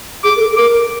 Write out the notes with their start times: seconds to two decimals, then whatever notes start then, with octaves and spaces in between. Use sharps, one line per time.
0.24 G#4 D6
0.36 A#4
0.40 A4
0.53 A4
0.56 A#4 D6